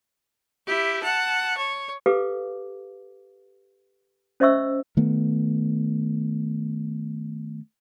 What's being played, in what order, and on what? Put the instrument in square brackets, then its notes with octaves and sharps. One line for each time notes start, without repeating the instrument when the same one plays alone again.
[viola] E4 G4
F#5 A5
C#5
[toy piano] G4 A4 B4 F5 D6
C#4 C5 D#5 E5 C#6 E6
[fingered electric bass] D#3 A3 B3